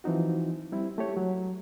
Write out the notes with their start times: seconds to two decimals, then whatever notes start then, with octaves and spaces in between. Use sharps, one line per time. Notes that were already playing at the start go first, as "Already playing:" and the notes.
0.04 E3 F3 C4 D#4 F#4
0.72 G3 C4 E4
0.98 A3 G4 C#5
1.17 F#3